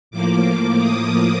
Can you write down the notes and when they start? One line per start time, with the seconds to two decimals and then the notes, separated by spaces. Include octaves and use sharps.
0.11 A2 F3 A#3 D6
0.80 D#6